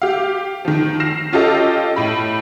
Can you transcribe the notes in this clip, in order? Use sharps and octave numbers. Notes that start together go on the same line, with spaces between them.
G4 F5
D#3 F3
F6 A#6 C7 E7
C#4 F4 G4 A4 D#5
A2 B5